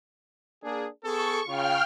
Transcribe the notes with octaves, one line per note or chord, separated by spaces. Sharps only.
A#3 D4 G#4
B3 G#4 A4 C#6
C#3 F4 F5 G5 F6